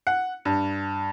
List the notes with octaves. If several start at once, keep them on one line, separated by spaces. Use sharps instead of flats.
F#5
G2